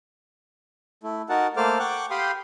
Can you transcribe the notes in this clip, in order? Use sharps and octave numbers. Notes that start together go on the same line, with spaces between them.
A3 E4
D#4 F#4 A#4 F#5 A5
A3 A#3 A4 C5 D6 F6
F#5 G5 C#6 D6 F#6
G4 F5 G5 B5 C6 D#6